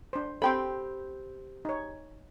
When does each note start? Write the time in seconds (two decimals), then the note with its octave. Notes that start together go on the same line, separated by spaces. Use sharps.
0.13 D4 C5
0.42 C4 G4 A4 C5 G5 B5
1.65 D#4 C#5